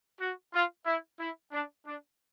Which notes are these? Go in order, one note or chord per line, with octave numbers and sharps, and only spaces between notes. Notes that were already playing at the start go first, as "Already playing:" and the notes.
F#4
F4
E4
E4
D4
D4